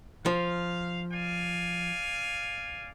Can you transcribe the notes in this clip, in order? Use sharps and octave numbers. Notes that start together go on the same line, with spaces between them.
F3 F5
D5 F5 G#5